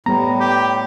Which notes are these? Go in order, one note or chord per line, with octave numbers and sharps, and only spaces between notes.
A2 G3 B3 A#5
G4